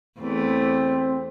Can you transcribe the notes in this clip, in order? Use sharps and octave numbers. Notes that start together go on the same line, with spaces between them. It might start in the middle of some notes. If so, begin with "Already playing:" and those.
E2 A3 C4